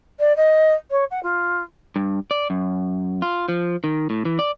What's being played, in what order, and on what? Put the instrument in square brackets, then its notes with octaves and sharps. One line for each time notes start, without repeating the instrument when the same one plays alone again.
[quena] D5
D#5
C#5
F#5
F4
[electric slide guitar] G2
D5
F#2
F4
F3
D#3
A2
E3
D5